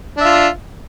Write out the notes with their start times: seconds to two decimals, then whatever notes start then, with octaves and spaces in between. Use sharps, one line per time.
0.17 D4
0.21 E5
0.24 F4